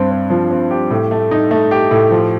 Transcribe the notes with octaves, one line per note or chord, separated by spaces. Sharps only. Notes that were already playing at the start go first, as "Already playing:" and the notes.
Already playing: G2 C4
C4
F3
C4
G4
A2
A3
D#4
A3
G4
A2
F3